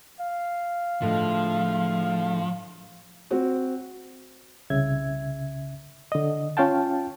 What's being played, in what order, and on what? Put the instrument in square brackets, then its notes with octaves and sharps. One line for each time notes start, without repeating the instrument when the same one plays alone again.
[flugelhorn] F5
[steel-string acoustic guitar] A2 D3 G#3 [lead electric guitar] F3
[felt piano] C4 F#4
[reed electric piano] C2 C#3 E5 G#6
D3 D#5
C#4 F4 F5 G5 A5